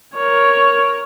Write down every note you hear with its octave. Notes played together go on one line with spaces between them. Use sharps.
A#4 C#5